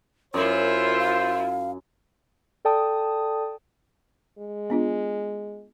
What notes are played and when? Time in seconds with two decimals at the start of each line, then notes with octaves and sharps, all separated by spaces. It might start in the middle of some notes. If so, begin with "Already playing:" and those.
0.34 F#2 E4 F4 C5 C#5
0.99 F5
2.65 A4 D5 G5 A5 D#6
4.39 G#3
4.70 B3 D4 F4